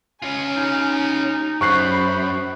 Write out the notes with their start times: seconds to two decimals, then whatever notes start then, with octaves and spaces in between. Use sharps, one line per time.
0.22 C#4 F4 G#5
0.56 D#4
1.61 F#2 C5 B5 C#6 F#6 C7